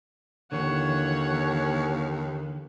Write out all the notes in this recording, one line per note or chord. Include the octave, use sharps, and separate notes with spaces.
D#2 D3 E3 C#5 F#5